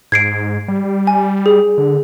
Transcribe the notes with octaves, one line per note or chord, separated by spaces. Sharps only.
G#2 G#6 C7 D7
G3
G#5
G#4
D3